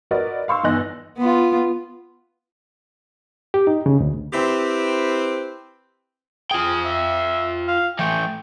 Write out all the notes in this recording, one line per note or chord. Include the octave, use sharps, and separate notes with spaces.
F#4 A#4 B4 D5 D#5
F5 C6 C#6 E6
G1 E2 D#4 D#5 F#6 A#6
B3 F4
G4
D#4
C#3
D2
C4 E4 G4 B4 C5
F4 G#4 G5
E5
F5
E3 A3 G5